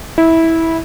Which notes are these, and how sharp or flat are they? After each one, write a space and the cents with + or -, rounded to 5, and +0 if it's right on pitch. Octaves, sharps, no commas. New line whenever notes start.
E4 -15